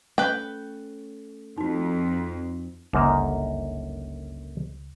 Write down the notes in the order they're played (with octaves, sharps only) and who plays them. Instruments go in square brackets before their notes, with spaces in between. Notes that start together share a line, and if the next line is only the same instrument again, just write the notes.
[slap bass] A3 C#4 [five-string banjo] B4 G5
[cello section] F2 [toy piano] D#4 F#4
[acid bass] G1 [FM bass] C#2 [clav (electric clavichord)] F#2 A#3 D#4